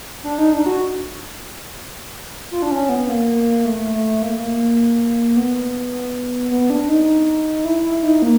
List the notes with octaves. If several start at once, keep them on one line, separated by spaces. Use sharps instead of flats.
D4
D#4
D4
F#4
F4
D4
C#4
B3
A#3
A3
A3
A#3
A3
A#3
B3
B3
D4
D#4
E4
E4
D#4
A#3